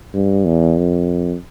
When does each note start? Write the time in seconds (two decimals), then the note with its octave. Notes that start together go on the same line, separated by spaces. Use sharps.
0.14 G2
0.46 E2
0.77 F2